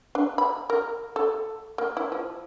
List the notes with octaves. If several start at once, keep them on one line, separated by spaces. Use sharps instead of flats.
D4
B5
A#4
A4
A#3
E4
F3